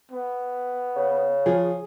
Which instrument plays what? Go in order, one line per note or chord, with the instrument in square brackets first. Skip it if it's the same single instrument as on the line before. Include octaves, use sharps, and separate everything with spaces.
[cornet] B3
[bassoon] C#3
[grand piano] F3 [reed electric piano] G#4